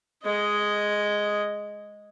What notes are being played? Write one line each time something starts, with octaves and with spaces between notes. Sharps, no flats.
G#3 D#5